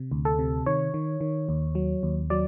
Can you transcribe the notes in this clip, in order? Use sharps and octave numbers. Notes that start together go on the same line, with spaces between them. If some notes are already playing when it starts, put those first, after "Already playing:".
Already playing: C3
D2
A4
C3
D#3 C#5
D#3
D#3
D#2
F#3
D#2
F#3 D5